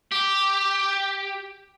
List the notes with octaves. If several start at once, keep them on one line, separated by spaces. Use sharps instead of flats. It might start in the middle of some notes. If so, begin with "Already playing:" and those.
G4